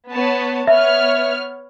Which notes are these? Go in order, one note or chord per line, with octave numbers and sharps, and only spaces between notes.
B3 C#5 A5
B3 C#5 E5 F6